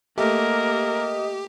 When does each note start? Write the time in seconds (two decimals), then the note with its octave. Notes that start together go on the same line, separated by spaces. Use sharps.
0.18 A3 A#3 G4 A#4 D#5